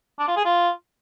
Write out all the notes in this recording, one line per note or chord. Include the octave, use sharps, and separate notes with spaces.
D4
F4
G#4
F4